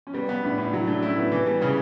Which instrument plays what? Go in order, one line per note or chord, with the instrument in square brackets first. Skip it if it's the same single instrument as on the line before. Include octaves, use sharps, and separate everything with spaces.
[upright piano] C#4
[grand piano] G3 [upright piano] B3
[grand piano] B3 [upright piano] C#4
[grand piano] A2 [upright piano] D4
[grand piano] A2 [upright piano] D4
[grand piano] F#3 [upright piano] E4
[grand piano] A3 [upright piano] D4
[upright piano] C#4 [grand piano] E4
[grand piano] A2 [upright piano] B3
[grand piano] E3 [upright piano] B3
[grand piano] G3
[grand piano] C#3 [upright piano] C#4